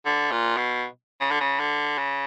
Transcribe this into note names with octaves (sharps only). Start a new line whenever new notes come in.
D3
A#2
B2
C#3
D3
C#3
D3
C#3